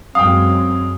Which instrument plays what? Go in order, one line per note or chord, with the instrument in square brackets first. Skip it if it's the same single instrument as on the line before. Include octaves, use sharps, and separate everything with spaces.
[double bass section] F#2 G#3 [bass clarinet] C4 [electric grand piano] F5 G5 [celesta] D#6